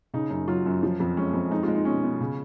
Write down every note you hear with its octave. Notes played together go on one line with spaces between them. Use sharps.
C#3 D#4
F#2 D#4
F#3 F4
F#2
F3
F2
G#3 C#4
F2
G#3 D#4
F4
G#3
D#4
B2 C#4
B2
C#3